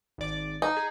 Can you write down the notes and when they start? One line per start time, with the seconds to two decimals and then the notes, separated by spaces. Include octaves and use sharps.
0.18 G#1 D5
0.62 D#4
0.77 G#4